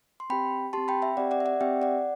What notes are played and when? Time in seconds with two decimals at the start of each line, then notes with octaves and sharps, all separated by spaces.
0.20 C6
0.30 C4 G4 G5 B5
0.73 C4 G4 A5 C6
0.88 G5 B5
1.02 E5 G5
1.17 C4 G4 D5 F#5
1.31 D5 F#5
1.40 E5
1.46 D5 F#5
1.61 C4 G4 E5 G5
1.82 D5 F#5